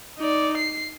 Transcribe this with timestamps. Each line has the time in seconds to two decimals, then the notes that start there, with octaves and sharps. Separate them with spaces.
0.18 D#4 D5
0.57 C7